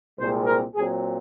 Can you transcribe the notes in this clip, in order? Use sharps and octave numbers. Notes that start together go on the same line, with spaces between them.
C2 A#2 G#3 C4 C5
A#4
A#2 F#3 C4 G#4